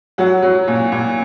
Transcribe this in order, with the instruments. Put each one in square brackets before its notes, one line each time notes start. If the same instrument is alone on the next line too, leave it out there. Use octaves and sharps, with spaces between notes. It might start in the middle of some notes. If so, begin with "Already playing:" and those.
[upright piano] F#3 F#5
F#3
A#2
A#2